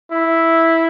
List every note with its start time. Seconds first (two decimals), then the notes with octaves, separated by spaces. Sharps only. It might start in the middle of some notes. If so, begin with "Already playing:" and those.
0.11 E4